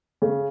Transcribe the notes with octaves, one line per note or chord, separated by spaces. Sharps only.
C#3